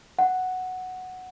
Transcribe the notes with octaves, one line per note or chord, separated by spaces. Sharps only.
F#5